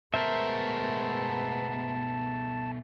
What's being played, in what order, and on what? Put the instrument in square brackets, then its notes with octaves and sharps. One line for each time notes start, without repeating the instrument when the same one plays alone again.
[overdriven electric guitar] B2 A3 [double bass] G#3 B3 [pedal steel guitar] A#4 C5 E5 [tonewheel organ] A5